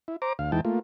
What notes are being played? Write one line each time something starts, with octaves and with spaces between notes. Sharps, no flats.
E4
C5 A#5 D6
D2 F5
E2 E3 G#3 D#4 G5 A5
A3 A#3 F4